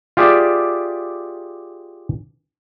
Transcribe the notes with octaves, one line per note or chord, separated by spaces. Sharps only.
F4 G4 G#4 D5 E5